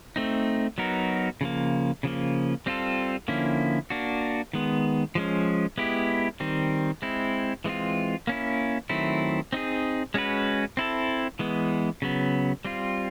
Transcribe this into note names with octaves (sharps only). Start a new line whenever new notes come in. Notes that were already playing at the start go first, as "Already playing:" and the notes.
A3 C4 D#4
F#3 B3 D#4 F#4 A#4
C#3 F3 A#3
C#3 F3 A#3
G3 C4 F4 A4
D3 F3 A#3 C#4 E4
A#3 D4 F#4
D#3 G#3 B3
F3 G#3 C#4
G#3 B3 E4 G4
D#3 G3 C4
G#3 C4 E4
E3 G#3 C4 F4
A#3 C#4 E4
D#3 F#3 A3 C4 E4
C4 D#4 G#4
G#3 C#4 F#4 B4
C4 E4 A4
E3 G#3 B3
C#3 F#3 B3
G3 C4 F4